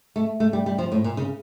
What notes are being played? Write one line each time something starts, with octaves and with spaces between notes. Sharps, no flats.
A3
A3
G3
G3
F3
A2
A#2
C#3